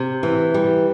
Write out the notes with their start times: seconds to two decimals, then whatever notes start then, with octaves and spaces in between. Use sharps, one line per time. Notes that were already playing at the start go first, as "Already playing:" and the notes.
Already playing: C3
0.23 E3
0.54 G3